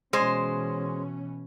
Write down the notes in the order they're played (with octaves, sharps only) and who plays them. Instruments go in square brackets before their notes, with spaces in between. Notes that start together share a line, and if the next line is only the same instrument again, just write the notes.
[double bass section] B2 E3 C#4 [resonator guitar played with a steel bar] G#3 C5